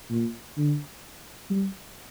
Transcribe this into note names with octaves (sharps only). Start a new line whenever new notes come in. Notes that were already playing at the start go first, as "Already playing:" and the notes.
A#2
D3
G3